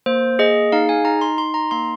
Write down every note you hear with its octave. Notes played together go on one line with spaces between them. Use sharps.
A#3 C5
G#4 D#5
D#4 F5
G#5
D#4 A#5
C6
D#4 C6
A#5
A#3 C6